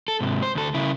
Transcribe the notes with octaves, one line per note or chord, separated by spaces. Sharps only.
A4
G#2 C3
C5
D2 A4
C#3 E4